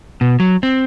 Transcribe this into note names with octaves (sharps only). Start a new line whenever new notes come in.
B2
F#3
C4